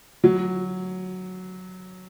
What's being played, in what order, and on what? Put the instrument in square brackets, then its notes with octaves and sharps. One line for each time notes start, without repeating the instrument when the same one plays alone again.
[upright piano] F#3